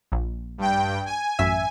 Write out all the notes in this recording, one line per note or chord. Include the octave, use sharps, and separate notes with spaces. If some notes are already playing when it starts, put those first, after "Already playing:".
A#1
G2 G5
G#5
A1 F#2 E5